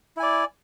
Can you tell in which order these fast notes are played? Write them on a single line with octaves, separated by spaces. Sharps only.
E4 G#5 D5